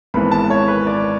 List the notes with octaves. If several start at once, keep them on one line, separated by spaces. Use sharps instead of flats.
G#1 G#2 E3 B3 B5
A5
C#5
B4
D5